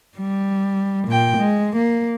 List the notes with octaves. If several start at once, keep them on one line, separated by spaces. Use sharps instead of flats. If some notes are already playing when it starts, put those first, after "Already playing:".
G3
A#2 G5
G#3
A#3